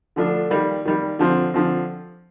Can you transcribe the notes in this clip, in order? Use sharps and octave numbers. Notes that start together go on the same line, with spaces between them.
D3 F3 A3 D4
D#3 G3 A#3
D#3 G3 A#3
D3 F3 C4
D3 F3 C4